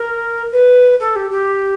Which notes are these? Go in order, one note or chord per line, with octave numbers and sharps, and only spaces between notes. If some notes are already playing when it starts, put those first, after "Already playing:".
Already playing: A#4
B4
A4
G4
G4